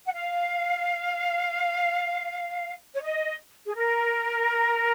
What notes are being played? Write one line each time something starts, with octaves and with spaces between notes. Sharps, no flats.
F#5
F5
C#5
D#5
G#4
A#4